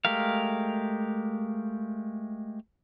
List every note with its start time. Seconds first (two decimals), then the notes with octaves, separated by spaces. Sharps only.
0.05 G#3 A3 G4 A#4 F5